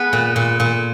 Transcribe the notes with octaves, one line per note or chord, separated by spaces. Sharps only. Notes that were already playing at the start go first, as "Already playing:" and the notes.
Already playing: B3 G#4 B4
A#2
A#2
A#2